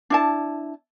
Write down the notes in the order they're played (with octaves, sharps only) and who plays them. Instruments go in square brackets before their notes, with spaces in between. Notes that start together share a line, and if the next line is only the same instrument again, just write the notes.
[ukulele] D4 E4 A5